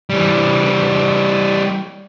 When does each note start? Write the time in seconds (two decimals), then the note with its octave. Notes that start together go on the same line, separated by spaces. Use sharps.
0.10 E3 G3